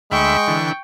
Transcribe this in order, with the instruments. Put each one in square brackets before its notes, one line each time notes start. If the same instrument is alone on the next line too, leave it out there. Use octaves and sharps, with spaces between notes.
[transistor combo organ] D2 E5 B5 [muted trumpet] G#3 [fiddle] G5 C#6
[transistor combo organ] D3 E3